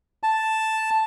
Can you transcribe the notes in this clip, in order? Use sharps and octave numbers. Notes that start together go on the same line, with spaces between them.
A5